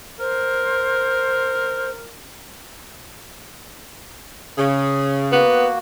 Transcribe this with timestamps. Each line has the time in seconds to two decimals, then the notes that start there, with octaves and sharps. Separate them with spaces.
0.20 A#4 C5
4.58 C#3
5.32 A#3 B3 F#4